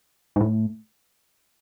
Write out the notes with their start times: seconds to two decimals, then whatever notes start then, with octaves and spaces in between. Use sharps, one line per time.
0.36 G#2
0.41 A2